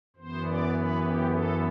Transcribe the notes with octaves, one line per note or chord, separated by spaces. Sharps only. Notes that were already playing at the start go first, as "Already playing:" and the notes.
F#2 E3 B3 C5
D5
B4
G4
A4